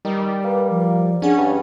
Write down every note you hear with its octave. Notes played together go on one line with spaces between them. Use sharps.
D#3 G3
A#3 B4
F3
C#4 D4 G#4 F#5
G2